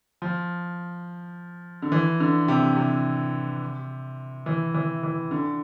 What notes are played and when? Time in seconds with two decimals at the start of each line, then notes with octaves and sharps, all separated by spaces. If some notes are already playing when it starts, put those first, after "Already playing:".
0.22 F3
1.82 D3
1.92 E3
2.20 D3
2.48 C3
2.77 C3
4.46 E3
4.74 E3
5.03 E3
5.31 D3